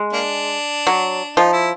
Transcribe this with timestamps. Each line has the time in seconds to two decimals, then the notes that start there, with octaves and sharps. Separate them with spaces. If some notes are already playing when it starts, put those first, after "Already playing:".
Already playing: G#3
0.13 A#3 D4
0.87 F#3
1.37 F3 D#4
1.53 E4